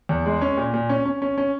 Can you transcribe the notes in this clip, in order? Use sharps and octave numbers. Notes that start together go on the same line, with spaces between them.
E2
G#3
C#4
A#2
A#2
C#4
C#4
C#4
C#4